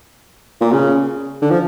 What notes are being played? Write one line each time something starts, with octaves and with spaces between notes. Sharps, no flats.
A#2
C#3
D3
F3